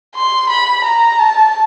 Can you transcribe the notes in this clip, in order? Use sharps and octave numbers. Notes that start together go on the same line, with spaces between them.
C6
B5
A#5
A5